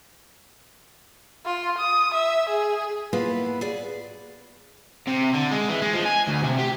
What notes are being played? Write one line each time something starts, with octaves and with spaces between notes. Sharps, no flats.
F4
D#6
E5
G#4
A#3 B3 E4 F4 G#4 B4
G#4 D5
C3
D3
G#3
E3
G#3
F3
G#5
D2
C3
G4